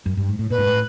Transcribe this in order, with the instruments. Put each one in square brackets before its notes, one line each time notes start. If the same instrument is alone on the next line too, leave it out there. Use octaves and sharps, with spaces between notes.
[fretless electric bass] F#2
G2
G#2
A2
[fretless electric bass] A#2 [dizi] B4
[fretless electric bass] G#2
A2